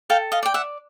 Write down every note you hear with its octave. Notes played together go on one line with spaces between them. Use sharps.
A4 F5 G5
D#5 F5
D5 G5
E5 F#5